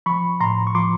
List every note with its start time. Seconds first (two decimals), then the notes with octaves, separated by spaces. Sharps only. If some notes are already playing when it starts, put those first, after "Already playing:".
0.06 F3 B5 C#6
0.40 A2 A#5 C6
0.67 C#6
0.75 F3 C6 D6